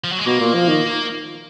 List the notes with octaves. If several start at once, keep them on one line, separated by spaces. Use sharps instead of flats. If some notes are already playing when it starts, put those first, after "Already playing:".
F3
F#3
G#3
B2 A#3
A#2
F3
D#3